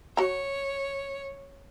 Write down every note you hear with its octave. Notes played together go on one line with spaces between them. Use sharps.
F#4 C#5 A#5